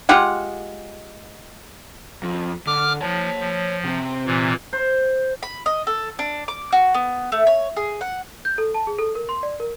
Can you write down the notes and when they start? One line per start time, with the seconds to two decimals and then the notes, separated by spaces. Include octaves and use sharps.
0.09 G#3 F4 G4 F#5
2.23 F2
2.67 D3 D6 F6
3.01 F3 C#5 A5
3.40 F3
3.84 C3 C4
4.26 A#2 E3
4.73 C5
5.43 B5
5.66 D#5
5.87 A4
6.19 D4
6.48 D6
6.72 F#4
6.94 B3
7.32 A3
7.47 C#5
7.76 G#4
8.01 F#5
8.45 G6
8.58 A4
8.74 A5
8.87 G#4
8.99 A4
9.15 A#4
9.29 C6
9.43 D5
9.60 A#4